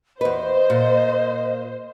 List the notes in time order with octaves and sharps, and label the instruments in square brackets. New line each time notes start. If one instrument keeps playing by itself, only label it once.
[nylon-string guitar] E2 B4 [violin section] C5 [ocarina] D#5
[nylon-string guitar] A#2